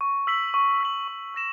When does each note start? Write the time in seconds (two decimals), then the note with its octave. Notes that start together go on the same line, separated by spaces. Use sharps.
0.01 C#6
0.27 E6 B6 F#7
0.54 C#6
0.81 E6 B6 F#7
1.08 C#6
1.34 E6 A#6 E7